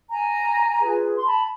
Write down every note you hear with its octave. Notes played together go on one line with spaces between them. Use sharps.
G#5 A#5
F4 G#4 B4
C6
A5 B5